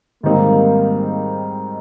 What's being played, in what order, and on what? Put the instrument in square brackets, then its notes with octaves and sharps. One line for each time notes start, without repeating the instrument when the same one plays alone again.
[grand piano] G#2 D#3 G3 C4 D#4 [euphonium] A#3